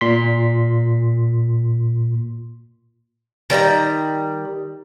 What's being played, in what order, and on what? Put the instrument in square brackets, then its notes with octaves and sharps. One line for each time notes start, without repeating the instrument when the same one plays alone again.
[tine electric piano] A#2 C6 B6
[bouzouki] D#3 G3 A#4 A#5